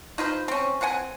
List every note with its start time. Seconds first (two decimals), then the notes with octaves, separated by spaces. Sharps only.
0.18 D#4 F4 B4 C5
0.48 C4 C#4
0.81 C4 B4 F#5 G#5